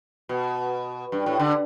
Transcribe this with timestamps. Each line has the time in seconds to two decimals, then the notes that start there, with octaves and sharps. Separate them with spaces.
0.29 B2
1.12 G2
1.26 A2
1.40 D3